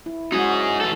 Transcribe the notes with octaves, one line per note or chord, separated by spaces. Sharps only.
E4
G#3 C#4 D#4 F#4 G#4
E3 A4